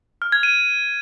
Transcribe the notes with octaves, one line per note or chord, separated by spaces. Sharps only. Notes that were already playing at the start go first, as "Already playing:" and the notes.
F6
G#6
D#7